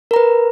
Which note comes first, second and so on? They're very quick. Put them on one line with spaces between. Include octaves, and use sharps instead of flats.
A#4 A#5 B4